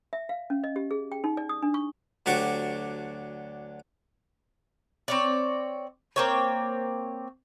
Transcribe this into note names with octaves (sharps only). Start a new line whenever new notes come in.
E5
F5
C#4
D#5
G4
G#4
G5
D#4
D5
D#6
D4
C#6
D2 F#3 D4 G4 F#5 C#6
C4 C#5 D5
A#3 C4 C#5